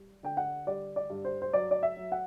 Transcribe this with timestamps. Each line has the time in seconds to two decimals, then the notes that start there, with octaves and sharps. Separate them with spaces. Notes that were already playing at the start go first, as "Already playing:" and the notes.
Already playing: G3
0.23 D3 G5
0.37 F#5
0.67 G3 D5
0.96 D5
1.10 G2
1.25 C5
1.42 C5
1.53 F#3 D5
1.71 D5
1.83 E5
1.96 F#3
2.12 F#5